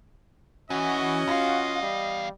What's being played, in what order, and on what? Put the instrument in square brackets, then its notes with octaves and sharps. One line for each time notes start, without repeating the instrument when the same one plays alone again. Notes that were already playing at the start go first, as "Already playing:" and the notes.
[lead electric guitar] E3 E4 [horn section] C#4 F#4 [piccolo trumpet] D#5
[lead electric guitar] E2 F5 [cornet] F4
[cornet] G3